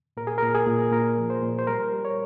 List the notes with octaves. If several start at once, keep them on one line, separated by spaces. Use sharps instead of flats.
A#2 A#4
G#4
A#2 A#4
G#4
A#2
A#2 A#4
F3
C5
A#2
C5
G3 A#4
G3
C#5